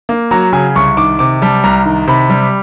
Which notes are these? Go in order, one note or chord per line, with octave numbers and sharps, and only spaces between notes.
A#3
F#3 A#5
C#3 G#5
C2 C#6
D#3 D6
C3 D6
G3 A5
C2 A#5
D#3
C3 B5
G3